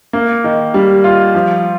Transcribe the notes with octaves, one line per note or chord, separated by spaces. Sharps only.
A#3
D#3
G3
F4
F3